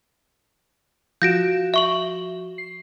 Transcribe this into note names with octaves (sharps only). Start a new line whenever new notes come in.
F3 F#4 G6 A#6 D7 E7
E5 C#6 F#7
C7